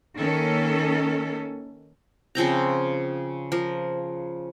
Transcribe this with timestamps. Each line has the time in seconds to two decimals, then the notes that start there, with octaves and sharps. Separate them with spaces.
0.18 D#3 A#3 C#4 A4
2.35 C#3 F3 C4 A#5
3.52 F3 A#4